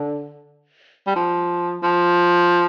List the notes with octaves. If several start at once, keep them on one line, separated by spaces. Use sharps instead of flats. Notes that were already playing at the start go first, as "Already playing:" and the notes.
Already playing: D3
G3
F3
F3